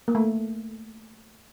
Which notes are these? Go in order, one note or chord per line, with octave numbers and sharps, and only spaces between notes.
A#3
A3